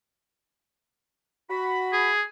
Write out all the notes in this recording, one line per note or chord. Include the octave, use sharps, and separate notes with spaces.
F#4 B5
G#4